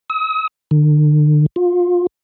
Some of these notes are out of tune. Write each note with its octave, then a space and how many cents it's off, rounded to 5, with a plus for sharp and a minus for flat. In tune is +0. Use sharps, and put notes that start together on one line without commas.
D#6 +45
D3 +40
F4 +25